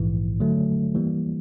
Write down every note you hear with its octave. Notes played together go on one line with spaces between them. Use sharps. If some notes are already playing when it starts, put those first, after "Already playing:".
Already playing: A#1 G#2 E3
D3 F#3 A3
E3 G3 A#3